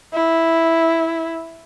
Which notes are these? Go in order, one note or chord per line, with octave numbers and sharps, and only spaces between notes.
E4